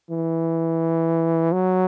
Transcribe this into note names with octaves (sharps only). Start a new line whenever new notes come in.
E3
F#3